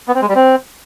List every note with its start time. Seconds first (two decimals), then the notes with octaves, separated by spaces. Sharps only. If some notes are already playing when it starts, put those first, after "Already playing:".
0.08 B3
0.15 C4
0.22 G#3
0.28 G3
0.35 C4